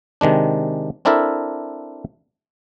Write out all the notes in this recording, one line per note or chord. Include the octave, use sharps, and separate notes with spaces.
C3 D#3 G#3 D4
C4 D4 E4 A4 A#4 E5